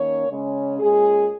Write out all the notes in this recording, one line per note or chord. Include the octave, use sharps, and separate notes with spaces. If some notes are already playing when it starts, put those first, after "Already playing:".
Already playing: D#3 A#3 C#4 C#5
C#3 G#3 C#4
A#2 G#3 C#4 G#4